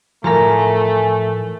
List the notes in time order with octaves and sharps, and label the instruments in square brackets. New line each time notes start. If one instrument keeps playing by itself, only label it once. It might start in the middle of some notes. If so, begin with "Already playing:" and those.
[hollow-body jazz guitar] A2 E3 F3 [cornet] A3 [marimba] A#4 F5 A#5 [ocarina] G#5